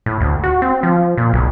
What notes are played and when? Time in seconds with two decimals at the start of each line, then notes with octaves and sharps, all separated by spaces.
0.06 A2
0.21 D2
0.44 F#4
0.62 C4
0.83 F3
1.18 A#2
1.33 B1